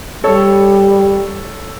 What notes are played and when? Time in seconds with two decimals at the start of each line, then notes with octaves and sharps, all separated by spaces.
0.24 G3 A4 C#5